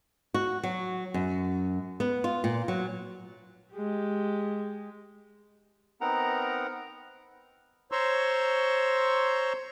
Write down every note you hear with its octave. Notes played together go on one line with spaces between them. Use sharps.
F#4
F#3
F#2
B3
F4
A#2
F#3
G#3 G4
B3 C4 D#4 A#4 F#5 A#5
C5 C#5 A#5 C6 C#6 E6